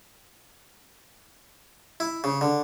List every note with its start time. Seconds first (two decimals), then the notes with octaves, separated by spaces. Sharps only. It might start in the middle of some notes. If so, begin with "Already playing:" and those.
2.00 E4
2.24 C#3
2.41 D3